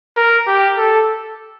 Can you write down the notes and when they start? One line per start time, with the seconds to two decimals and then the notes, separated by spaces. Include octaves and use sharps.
0.16 A#4
0.47 G4
0.77 A4